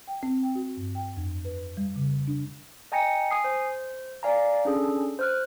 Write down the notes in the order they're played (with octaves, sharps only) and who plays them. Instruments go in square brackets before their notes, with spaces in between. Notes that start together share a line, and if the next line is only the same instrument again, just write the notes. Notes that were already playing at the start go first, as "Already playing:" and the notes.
[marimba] G5
C4
G5
F#4
G2
G5
F2
B4
G3
C#3
D4
[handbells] D#5 G5 G#5 A#5 A#6 C#7
G#5 D#6 C7
C5
D5 F5 G#5 A#5
C#4 D4 G#4 A4
C5 F6 F#6